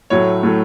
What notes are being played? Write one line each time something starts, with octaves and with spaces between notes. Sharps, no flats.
A2 F#3 A3 C#5
A2 F#3 A3